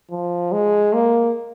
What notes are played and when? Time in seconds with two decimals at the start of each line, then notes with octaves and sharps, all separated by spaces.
0.11 F3
0.52 G#3
0.94 A#3